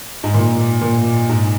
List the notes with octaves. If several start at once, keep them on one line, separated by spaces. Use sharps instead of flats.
G#2
A#2
A#2
G#2